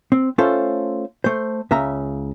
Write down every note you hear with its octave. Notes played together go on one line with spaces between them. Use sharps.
C4
A3 C#4 F4 A4 C5
A3 C5
C#2 C#3 E5 A#5